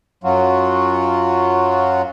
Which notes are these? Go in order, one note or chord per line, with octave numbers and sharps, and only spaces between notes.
F#2 F#3 F4 F#4